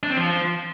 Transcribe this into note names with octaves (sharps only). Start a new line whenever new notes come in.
D4
C4
F3